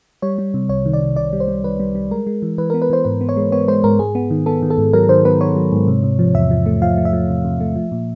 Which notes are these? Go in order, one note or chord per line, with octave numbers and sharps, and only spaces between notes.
G3 C#5
G3
C3
C2 C#5
D#3
D5
D#3
C2 D5
G3
C5
G3
D#3 B4
G3
G3
G#3 A#4
G#3
E3
E3 B4
B3 A#4
B4
E3 C5
G#2 B4
B3
C#5
G#3
B3 C#5
G#3 C5
G#2 A#4
G#2 G#4
B3
D#3
B3 A4
D#3
A4
G#2
F#3 A#4
D#3 C5
B3 B4
B3 C#5
F#3
G#2
C3
C3
F3
E2 E5
F3
A3
F3 F5
A3
E5
F3
C3
C3
A3
F3
A#2